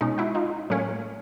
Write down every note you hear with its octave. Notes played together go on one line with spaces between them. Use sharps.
B2 G#3 C#4 D#4
E4 F#4
D#4 F4
A2 F#3 A#3 C#4